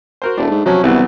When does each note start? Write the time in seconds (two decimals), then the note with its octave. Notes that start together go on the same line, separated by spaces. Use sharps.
0.22 F#4 A#4 C5
0.37 E1 A3 D4
0.51 G#2
0.66 C3 F3 F#3 C#4
0.83 C2 C#3 E3 F#3 B3